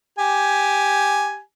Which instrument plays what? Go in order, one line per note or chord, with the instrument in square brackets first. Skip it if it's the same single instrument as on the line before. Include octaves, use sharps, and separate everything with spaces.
[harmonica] G4 G#5